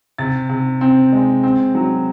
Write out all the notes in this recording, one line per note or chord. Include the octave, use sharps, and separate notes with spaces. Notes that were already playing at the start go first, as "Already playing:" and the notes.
C3 A6
C3
C4
G#3
C4
F#3